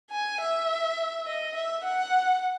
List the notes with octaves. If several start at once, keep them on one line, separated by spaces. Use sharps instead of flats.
G#5
E5
D#5
E5
F#5